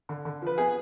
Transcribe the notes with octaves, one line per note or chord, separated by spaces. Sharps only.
D3
D3
F3 B4
B3 G#4